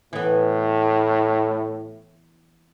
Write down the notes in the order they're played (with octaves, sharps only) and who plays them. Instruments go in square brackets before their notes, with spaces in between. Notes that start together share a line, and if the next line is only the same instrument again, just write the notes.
[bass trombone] A2 [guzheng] E3 B3